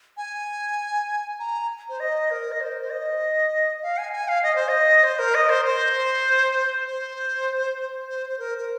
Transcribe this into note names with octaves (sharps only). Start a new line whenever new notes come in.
G#5
A#5
C5
D#5
A#4
D#5
C5
C5
D#5
F5
G#5
G#5
F5
D#5
C5
D#5
C5
A#4
D#5
C5
C5
C5
C5
C5
A#4
A#4